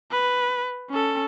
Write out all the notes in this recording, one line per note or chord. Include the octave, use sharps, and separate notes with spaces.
B4
C#4 A4